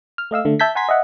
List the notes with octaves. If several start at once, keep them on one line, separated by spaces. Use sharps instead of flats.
F6
A3 D#5 F5 E6
D3 A3
E5 A5 G6 G#6 B6
F#5 G#5 A#5 C6 G#6 B6
D#5 E5 F#5